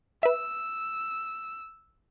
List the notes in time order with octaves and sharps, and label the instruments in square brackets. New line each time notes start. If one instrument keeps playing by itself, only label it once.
[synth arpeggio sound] B4 E5 [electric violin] E6